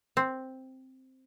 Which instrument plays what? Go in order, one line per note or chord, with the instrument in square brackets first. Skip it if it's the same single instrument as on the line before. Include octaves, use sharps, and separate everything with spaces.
[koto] C4